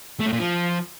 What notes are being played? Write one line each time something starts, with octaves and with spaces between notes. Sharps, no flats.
A3
A2
A#2
F3